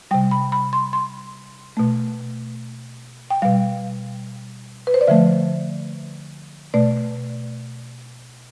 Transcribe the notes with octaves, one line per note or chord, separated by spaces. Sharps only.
C3 G3 G5
B5
B5
C6
C6
B2 A3
G5
B2 G3 F5
B4
C5
D5
D3 F3 A3 E5
B2 A3 D5